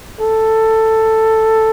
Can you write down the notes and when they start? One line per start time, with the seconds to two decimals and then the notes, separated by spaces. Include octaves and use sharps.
0.20 A4